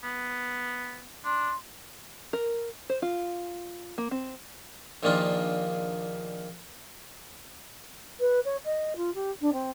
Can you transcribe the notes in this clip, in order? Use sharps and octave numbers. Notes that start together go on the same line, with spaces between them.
B3
D4 C6
A#4
C5
F4
A#3
C4
A#1 A#2 D#3 A#3 D4 F4
B4
C#5
D#5
F4
G4
D4
C4